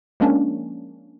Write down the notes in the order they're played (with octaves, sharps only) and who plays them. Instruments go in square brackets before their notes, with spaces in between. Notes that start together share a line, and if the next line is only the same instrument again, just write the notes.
[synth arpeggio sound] F3 G#3 A#3 C#4 D4